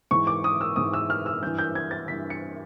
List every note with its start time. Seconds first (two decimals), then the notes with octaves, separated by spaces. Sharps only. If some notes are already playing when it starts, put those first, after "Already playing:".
0.11 G#2 E3 C#6
0.27 D6
0.44 D#6
0.61 E6
0.76 G#2 E3 D#6
0.93 E6
1.10 F6
1.26 E6
1.42 G2 E3 G6
1.59 G6
1.75 G#6
1.91 A6
2.08 G2 E3 B6
2.30 C#7